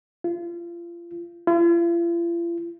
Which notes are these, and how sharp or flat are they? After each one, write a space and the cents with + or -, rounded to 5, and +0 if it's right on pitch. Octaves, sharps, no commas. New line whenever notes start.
F4 -30
F4 -45